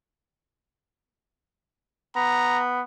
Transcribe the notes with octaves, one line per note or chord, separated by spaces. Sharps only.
B3 A#5